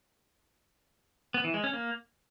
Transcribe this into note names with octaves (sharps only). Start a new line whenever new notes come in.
B3
E3
G#3
C#4
A#3